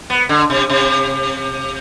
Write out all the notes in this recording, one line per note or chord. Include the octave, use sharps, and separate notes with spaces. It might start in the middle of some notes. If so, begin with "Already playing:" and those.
B3
D3
C3
C3